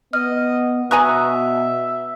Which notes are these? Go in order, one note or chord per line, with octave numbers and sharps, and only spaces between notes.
B3 D#5 F6
B2 B4 E5 G#5 A#5 C#6 D#6 F#6